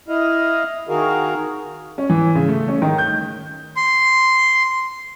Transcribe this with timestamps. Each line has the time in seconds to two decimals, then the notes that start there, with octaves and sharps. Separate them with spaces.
0.08 E4 D#5 F5
0.89 D#3 F#4 G#4 A#4 F5
1.98 C#4
2.10 E3
2.35 C#3
2.48 A3
2.68 C#4
2.82 D#3
2.98 G6
3.77 C6